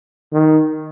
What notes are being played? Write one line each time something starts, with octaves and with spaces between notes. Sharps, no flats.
D#3